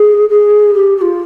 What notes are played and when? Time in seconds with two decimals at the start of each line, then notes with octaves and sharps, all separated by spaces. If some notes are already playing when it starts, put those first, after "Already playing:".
Already playing: G#4
0.30 G#4
0.74 G4
0.97 G4
1.01 F4